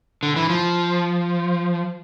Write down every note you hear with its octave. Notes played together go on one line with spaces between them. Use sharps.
D3
E3
F3